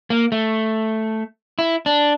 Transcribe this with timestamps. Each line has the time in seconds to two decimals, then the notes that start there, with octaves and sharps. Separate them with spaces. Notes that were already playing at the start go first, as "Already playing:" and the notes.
0.10 A#3
0.32 A3
1.59 E4
1.86 D4